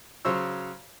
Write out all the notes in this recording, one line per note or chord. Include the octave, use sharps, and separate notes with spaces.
C#3 F#3 C5 C#5 E6